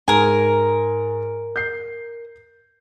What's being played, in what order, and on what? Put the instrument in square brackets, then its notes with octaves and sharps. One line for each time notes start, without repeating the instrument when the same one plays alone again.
[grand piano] G#2 [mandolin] A#4 G#5
[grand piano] G6 C7